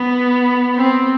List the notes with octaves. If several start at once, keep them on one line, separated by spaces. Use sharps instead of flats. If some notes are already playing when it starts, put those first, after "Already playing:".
Already playing: B3
C4